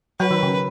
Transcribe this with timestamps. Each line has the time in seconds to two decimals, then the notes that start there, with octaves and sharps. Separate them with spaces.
0.19 F#3 B4
0.31 D#3
0.43 C#3